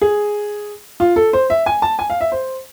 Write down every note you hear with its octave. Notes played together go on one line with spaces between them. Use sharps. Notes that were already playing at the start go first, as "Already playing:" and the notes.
G#4
F4
A4
C5
E5
G#5
A5
G#5
F5
E5
C5